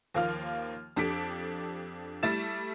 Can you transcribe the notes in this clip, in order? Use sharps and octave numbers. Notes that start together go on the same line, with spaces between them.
D#2 F3 A#3 F4 F6
F2 D4 G4 A4 B6 D7
G3 A3 E4 A6 E7